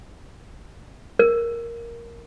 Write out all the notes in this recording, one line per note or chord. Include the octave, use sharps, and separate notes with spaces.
A#4